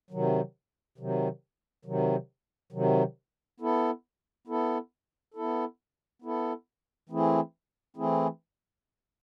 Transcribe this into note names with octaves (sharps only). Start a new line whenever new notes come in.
C3 D#3 F#3
C3 D#3 F#3
C3 D#3 F#3
C3 D#3 F#3
B3 E4 A4
B3 E4 A4
B3 E4 A4
B3 E4 A4
E3 A3 C4 E4 G#4
E3 A3 C4 E4 G#4